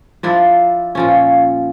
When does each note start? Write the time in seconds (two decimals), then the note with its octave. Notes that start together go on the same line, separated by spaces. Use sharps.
0.23 F3 D4 E4
0.95 A#2 F3 C#4